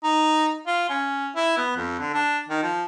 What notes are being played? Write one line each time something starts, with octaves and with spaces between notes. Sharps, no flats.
D#4
F4
C#4
E4
B3
F2
D3
D4
D#3
F3